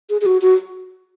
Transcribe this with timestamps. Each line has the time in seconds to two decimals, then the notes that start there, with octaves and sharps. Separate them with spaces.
0.10 G#4
0.21 G#4
0.26 F#4
0.42 F#4